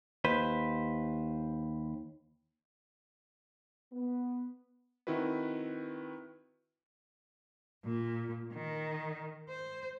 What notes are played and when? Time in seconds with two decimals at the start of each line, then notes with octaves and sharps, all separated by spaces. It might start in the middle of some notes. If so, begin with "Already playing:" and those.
0.24 D#2 B4 C5
3.92 B3
5.07 D#3 C4 E4 F#4 B4
7.85 A#2
8.53 D#3
9.49 C5